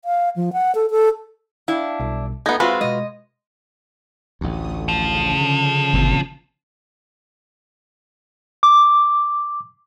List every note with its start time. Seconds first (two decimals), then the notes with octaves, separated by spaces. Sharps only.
0.05 F5
0.36 F3
0.53 F#5
0.75 A4
0.91 A4
1.68 D4 E4 F5 G5
2.00 B1 B2 G3
2.46 A3 B3 D#4 A#5 G#6 A#6
2.60 G#3 C4 F4 F#4 B4 E5 F5
2.81 B2 G#3 D#5
4.41 A1 D2 A3 D#6
4.88 C#3 F3
5.41 D3
5.93 G1 A#2 E3 C4
8.63 D6